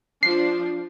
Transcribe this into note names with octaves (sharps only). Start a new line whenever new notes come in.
F3 D4 C7